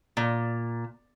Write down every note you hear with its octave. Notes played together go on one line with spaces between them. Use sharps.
A#2